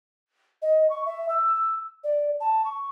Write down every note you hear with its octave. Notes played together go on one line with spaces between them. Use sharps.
D#5
C#6
E5
E6
D5
A5
C#6